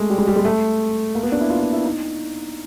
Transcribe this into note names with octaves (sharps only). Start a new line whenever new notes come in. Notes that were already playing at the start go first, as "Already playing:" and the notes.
Already playing: G#3 A3
G3
G#3
G3
G#3
A3
A#3
B3
D4
E4
F4
F4
E4
D#4